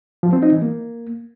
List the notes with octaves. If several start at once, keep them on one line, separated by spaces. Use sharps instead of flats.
F3
C4
D#4
E3
A#3